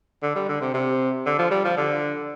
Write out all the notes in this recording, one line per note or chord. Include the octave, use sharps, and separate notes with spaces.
D3
G3
D3
C3
C3
D3
F3
G3
F3
D3